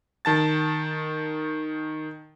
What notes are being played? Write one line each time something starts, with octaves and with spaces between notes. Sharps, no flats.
D#3 A5 A6